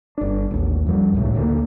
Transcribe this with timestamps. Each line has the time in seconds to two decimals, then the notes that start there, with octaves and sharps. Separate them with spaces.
0.18 G1 D4
0.51 A1 D#2
0.86 F2 F3 G3
1.14 C#2 A2 C3
1.34 D2 D3 A#3